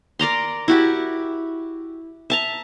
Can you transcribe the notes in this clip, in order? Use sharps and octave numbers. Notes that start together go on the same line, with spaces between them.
A#4 D5 A#5 C6
E4 F#4 G4
E5 A5 A#5